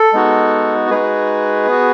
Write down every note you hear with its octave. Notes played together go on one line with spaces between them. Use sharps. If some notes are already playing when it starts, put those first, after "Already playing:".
Already playing: A4
G#3 B3 D#4 F#4
G#3 D#4 F#4 G#4 B4
B3 F#4